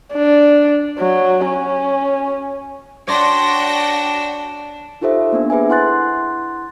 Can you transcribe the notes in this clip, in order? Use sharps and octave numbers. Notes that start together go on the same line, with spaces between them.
D4
F#3
C#4
D4 F#4 C#5 D5 G5 C6 A#6
D#4 F4 G4 A4 C5 E5
A#3 B3 D4
G#4 B4 E5 G#5
E4 F#5 C6 F#6 A6